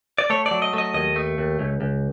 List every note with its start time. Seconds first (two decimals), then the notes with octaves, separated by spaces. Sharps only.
0.18 D5
0.30 A3 C#5
0.46 D5
0.51 F#3
0.62 D#5
0.73 A3 D#5
0.94 D#2 D#5
1.16 A3
1.38 D#2
1.59 C#2
1.81 C#2